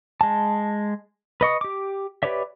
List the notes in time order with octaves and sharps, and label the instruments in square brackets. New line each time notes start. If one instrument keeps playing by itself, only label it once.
[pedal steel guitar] G#3 A5
B4 D#5 C#6 D#6
G4 D6
G4 B4 C#5 D5 E5